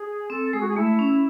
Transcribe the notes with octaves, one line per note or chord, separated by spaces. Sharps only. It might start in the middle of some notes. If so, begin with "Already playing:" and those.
Already playing: G#4
C4 A4
G#3 G#4
F#4
G#4
A3 E4
C#4